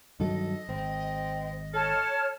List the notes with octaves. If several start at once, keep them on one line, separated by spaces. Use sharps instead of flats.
G2 D#3 F#3 A4 D#5
G#1 C4
A4 C#5 A5 F6